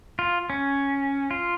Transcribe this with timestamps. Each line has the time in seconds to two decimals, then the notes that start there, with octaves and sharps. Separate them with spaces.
0.19 F4
0.50 C#4
1.31 F4